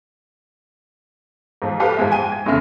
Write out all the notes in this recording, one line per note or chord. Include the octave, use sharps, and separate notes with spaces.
G#2 F3
G4 A4 B4 F5
G#2 F3 G#3 E5
G5 G#5 D#7
G#6
F1 E2 C#3 E5 F6